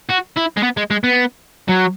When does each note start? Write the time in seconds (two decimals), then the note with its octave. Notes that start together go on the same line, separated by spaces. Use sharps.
0.10 F#4
0.37 E4
0.57 G#3
0.63 B3
0.77 G#3
0.91 G#3
1.04 B3
1.69 F#3